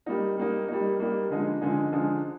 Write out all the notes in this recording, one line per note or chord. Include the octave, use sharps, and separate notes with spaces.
G3 A#3 D#4
G3 A#3 D#4
G3 A#3 D#4
G3 A#3 D#4
D3 F3 G#3 D#4 G#4
D3 F3 G#3 D#4 G#4
D3 F3 G#3 D#4 G#4